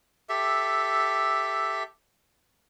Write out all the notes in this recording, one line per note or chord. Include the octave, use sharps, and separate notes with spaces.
G4 A4 E5